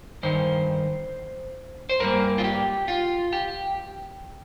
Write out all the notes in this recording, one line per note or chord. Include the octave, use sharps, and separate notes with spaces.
G2 D#3 C5
C5
G2 G3 A#3 A#4
F4
G4
F4
G4